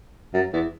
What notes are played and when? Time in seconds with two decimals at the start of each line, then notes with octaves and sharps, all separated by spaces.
0.34 F#2
0.53 E2